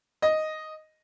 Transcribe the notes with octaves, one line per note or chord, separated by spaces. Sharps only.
D#5